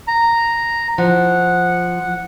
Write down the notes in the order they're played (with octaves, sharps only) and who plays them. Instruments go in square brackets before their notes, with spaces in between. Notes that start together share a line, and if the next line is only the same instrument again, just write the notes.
[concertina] A#5
[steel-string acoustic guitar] F3 [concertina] F#5